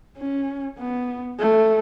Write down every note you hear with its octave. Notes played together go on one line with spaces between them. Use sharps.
C#4
B3
A3